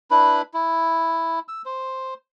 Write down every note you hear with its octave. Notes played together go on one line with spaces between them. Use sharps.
D4 E4 B4 B5
E4
E6
C5